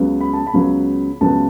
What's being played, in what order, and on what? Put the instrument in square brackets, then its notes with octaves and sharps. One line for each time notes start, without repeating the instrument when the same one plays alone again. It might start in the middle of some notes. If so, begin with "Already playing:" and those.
Already playing: [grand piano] C#2 C#3 F#3 B3
B5
A5
B5
C#2 C#3 F#3 B3
C#2 C#3 F#3 B3 A5